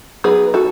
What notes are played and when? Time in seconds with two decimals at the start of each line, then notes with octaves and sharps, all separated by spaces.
0.24 F#3 B3 D#4 G#4 B4
0.54 F#4 A4